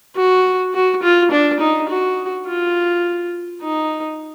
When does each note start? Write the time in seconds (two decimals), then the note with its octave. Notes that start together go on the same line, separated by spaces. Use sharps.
0.17 F#4
0.74 F#4
1.03 F4
1.31 D4
1.60 D#4
1.90 F#4
2.47 F4
3.62 D#4